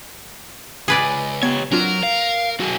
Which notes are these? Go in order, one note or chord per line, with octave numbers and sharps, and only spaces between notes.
C#2 G#4 B4 D5
B3 G4 C#5 G#6
F#3 C4 D4 F4 A#4
F5
B1 F#2 F#4 G#4